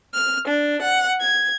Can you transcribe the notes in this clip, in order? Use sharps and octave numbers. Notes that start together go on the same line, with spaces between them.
F6
D4
F#5
G#6